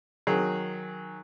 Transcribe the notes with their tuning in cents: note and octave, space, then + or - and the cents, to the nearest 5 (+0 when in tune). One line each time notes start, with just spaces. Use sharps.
D#3 +0 F#3 -5 G#4 +0